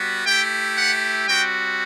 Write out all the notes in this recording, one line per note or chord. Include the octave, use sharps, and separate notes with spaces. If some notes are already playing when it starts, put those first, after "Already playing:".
Already playing: G3 B3 F#4
A3 E4 G4 G5
F#5
G3 C4 F#4 G5